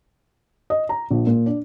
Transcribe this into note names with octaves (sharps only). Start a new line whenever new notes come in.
D#5
A#5
A#1
A#2
D4